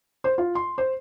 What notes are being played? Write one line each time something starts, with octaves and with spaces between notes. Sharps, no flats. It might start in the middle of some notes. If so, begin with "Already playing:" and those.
C5
F4
C6
C5